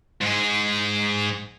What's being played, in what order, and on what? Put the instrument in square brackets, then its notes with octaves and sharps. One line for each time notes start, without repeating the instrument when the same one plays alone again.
[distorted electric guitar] G#2 G#4